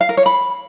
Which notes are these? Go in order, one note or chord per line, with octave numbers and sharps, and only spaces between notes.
F5
A#4
C#5
B5